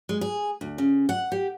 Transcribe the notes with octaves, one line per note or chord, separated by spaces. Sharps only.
G#3
G#4
D2
C#3
F#5
G4